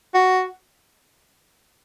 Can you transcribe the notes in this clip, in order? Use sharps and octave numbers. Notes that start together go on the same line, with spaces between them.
F#4